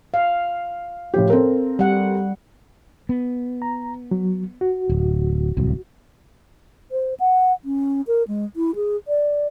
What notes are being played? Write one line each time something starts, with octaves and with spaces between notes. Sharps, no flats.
F5
A2 F3 G4
C4 A4 A#4
G3 F#5
B3
A#5
F#3
F#4
D1
D1 C2
C5
F#5
C#4
A#4
G#3
E4
G#4
D5